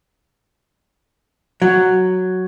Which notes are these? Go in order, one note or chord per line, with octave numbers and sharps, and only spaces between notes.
F#3